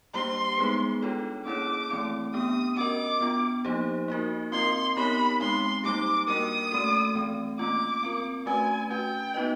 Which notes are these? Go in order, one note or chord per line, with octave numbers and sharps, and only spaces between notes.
G3 A#3 D4 G4 C5 C6
G#3 B3 D#4 G#4 B4
D4 F4 A4 C#5
A#3 C#4 E4 G#4 C#5 D6
E3 A3 C4 E4
B3 D4 G4 D#6
C#4 F#4 A#4 D#5 D6
B3 D4 F4
F3 A#3 D#4 G4 C5
A#3 D#4 F#4 A#4
C4 F4 A#4 D#5 C6
B3 D#4 G4 A#4 C#5 B5
G#3 C4 D#4 C6
G3 A#3 D#4 G4 D6
A#3 D4 F#4 A#4 D#6
A3 C#4 F#4 A4
E3 A3 C4
A#3 C#4 F4 D6
C4 F4 A#4
A3 C#4 F#4 B4 G#5
C#4 F#4 B4 G5
B3 D#4 F#4 B4 D#5